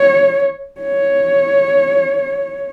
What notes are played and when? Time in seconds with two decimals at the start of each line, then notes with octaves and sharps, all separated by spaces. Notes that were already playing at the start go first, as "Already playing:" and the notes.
Already playing: C#5
0.81 C#5